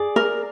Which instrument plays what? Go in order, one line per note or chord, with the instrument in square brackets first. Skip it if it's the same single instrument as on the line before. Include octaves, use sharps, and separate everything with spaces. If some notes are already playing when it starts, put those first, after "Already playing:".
Already playing: [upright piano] G#4 [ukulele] D5
[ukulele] A#4